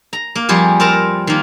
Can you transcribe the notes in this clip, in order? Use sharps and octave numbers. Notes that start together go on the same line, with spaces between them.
A#5
A#3
F2 G3 G4 G#4
C4 A#4 A5 A#5
D#3 A#3